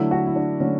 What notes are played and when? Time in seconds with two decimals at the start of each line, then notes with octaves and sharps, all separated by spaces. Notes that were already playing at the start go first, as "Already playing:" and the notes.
Already playing: D3 F#3 A3 E4
0.11 F#4
0.26 E4
0.36 D4
0.60 D3 F#3 A3 C#4